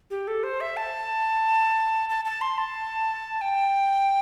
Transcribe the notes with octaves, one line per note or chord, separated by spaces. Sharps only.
G4
A4
C5
E5
A5
A5
A5
C6
A5
G5